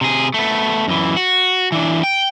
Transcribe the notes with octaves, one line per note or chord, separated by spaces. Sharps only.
C3 G#4
A3 B3
F#2 E3
F#4
E3 D4
G5